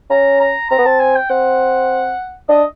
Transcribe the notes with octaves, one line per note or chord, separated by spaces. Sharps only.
C#4 A#5
A#5
C4 A#5
B3
C4 A5
G#5
G5
C4 F#5
D4 D#5